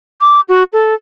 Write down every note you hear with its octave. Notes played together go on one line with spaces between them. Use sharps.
D6
F#4
A4